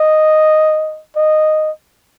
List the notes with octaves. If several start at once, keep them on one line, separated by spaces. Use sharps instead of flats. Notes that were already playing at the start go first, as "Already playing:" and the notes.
Already playing: D#5
D#5